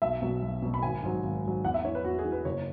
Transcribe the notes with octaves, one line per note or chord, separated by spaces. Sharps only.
B1 E5
B2 F#3
B1
B2 F#3
B5
G#1 G#5
G#2 F#3
G#1
G#2 F#3
E2 F#5
E5
E3 C#5
B4
E2 F#4
G#4
E3
B4
F#1 C#5